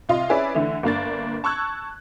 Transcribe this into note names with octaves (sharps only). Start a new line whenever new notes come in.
C2 F4 D#5 C6
C#4 E4 G#4 B4 D5 E5
D3 E3 A3
G1 A#3 D4 A6
A5 C#6 E6 F#6 G#6